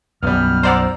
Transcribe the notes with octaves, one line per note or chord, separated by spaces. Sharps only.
B1 F#2 G3 B3 F6
C5 D5 F#5 A#5 E6